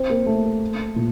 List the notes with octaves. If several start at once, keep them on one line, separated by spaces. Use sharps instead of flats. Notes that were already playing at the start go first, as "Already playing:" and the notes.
Already playing: C4
A#3
A3
A#2